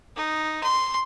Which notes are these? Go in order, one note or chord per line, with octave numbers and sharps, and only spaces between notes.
D#4
C6